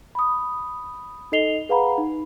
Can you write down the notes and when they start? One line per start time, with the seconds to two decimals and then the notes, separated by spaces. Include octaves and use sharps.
0.15 B5 D#6
1.32 D#4 A4 D#5 C7 F7 G7
1.69 G#4 B4 F5 F#5 A#5 B5
1.98 D#4